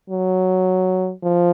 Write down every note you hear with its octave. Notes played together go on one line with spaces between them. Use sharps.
F#3
F3